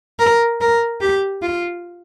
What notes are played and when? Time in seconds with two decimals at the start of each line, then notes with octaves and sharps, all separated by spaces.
0.19 A#4
0.61 A#4
1.01 G4
1.42 F4